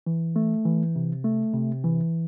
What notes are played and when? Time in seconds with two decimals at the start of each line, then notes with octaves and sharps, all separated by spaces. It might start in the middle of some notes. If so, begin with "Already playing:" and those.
0.07 E3
0.36 A3
0.65 E3
0.96 C3
1.24 A3
1.53 C3
1.84 E3